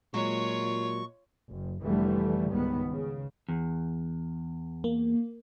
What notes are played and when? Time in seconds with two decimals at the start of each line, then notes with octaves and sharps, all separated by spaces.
0.14 A#2 F#3 G#3 F4 C#5 C#6
1.49 F#1
1.82 F1 D3 E3 G3 A3
2.51 C#2 G#2 D#3 B3
2.92 C#3
3.48 E2
4.84 A#3